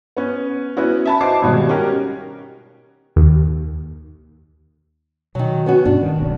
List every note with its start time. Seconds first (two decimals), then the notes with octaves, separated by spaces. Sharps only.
0.17 B3 C#4
0.77 B3 C#4 E4 F#4
1.06 E5 A5 B5
1.21 D#4 F#4 C5 A5 D6 C7
1.42 G#1 B2 G3 G#3
1.69 C#4 F#4 G4 A#4
3.16 D#2
5.35 B2 D#3 F#3
5.66 B3 C#4 F#4
5.85 G2 B2 B3 D4
6.01 A2 D#3
6.17 D1 B1 A#3